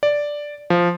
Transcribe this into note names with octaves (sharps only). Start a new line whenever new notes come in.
D5
F3